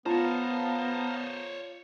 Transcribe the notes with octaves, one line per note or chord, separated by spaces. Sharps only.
B3 F4 C5 C#5 F5 A5 A#5